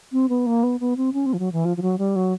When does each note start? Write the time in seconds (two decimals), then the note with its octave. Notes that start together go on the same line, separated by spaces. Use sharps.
0.12 C4
0.29 B3
0.46 A#3
0.63 B3
0.80 B3
0.97 C4
1.13 C#4
1.26 C4
1.33 F3
1.39 F#3
1.52 E3
1.65 F3
1.77 F3
1.82 F#3
1.98 G3
2.16 F#3